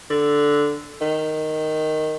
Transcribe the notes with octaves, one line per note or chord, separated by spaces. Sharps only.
D3
D#3